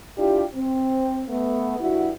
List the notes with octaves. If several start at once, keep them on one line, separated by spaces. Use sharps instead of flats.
D4 E4 F4 G4
C4
A3 B3
G2 E4 F#4